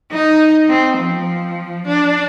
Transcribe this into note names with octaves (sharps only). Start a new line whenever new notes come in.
D#4
C4
F3
D4